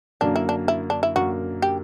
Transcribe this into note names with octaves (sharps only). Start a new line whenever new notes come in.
F#2 D3 A#3 D4
E4
D4
E4
D4
E4
F#2 D3 A#3 F#4
G4